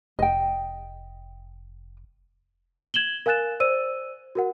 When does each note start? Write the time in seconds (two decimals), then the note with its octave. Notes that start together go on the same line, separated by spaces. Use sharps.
0.19 F1 D#5 G5
2.94 G#6 E7 F#7 G7
3.26 A#4 F5 G#5 F#6 A6 E7
3.60 C5 D5 E6 D#7
4.35 F#4 A#4 F#5